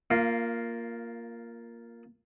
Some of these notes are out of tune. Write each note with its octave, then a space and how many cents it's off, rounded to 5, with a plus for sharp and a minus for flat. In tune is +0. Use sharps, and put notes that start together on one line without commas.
A#3 +0 F4 +0 F5 -30